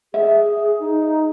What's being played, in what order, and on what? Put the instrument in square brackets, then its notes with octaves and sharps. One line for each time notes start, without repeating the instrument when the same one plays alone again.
[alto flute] G#4 [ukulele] E5
[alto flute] D#4